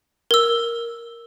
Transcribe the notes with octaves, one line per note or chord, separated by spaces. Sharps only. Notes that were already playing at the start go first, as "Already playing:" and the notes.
A#4 E6